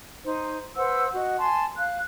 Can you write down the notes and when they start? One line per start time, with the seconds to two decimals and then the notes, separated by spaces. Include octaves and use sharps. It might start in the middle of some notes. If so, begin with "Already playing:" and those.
0.24 D#4 C5
0.76 B4 C5 F#5 E6
1.13 F#4 D#5
1.39 G#5 A5 C6
1.77 F5 F#6